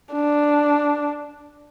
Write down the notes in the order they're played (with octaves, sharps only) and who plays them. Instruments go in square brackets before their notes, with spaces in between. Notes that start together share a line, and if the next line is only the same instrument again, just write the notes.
[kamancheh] D4